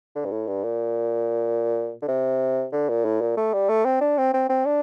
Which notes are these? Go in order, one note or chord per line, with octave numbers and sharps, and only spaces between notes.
D3
G2
A2
G2
A#2
D3
C3
D3
A#2
A2
A#2
A3
G3
A3
C4
D4
C4
C4
C4
D4